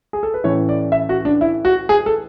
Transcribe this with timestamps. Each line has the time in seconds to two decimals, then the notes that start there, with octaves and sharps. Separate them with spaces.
0.13 G#4
0.23 A4
0.34 B4
0.44 A2 E3 A3 C#4 C#5
0.69 D5
0.92 E5
1.09 F#4
1.25 D4
1.41 E4
1.65 F#4
1.89 G#4
2.06 A4